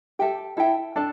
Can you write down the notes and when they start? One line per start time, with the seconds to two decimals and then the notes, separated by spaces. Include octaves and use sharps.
0.19 G4 A4 E5 G5
0.57 E4 A4 E5 G5
0.96 D4 A4 D5 A5